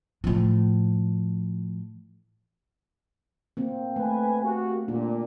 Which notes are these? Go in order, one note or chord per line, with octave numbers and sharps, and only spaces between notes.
A2 F3
A#3 C4
A3 B4 G#5
A#3 F#4 G4
A#2 D4